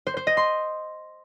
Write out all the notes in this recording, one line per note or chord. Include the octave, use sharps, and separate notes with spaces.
C5
C5
D#5
C6